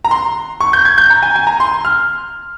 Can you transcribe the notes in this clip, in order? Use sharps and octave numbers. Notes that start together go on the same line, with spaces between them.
A#5
C6
C#6
G6
G#6
G6
A#5
G#5
G#5
A#5
C6
F6